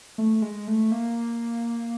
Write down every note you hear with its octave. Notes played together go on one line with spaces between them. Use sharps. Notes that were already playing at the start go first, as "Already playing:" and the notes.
A3
G#3
A3
A#3